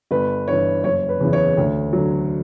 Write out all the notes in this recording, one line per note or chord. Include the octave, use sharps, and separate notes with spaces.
G1 B4
G2 E3 C#5
F#1 C#5
B4
E2 C#3 E3
C#5
D2
D3 F#3